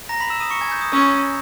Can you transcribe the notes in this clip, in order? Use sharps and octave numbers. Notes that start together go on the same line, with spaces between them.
A#5 A#6
B5 B6
E6 E7
D#6 D#7
C#6 C#7
G#5 G#6
G6
D#6
C#4 E6